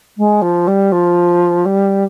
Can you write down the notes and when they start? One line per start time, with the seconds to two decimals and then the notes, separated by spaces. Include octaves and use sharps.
0.17 G#3
0.41 F3
0.67 G3
0.92 F3
1.65 G3